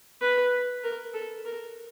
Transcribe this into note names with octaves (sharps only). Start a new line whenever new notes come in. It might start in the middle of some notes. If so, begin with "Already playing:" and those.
B4
A#4
A4
A#4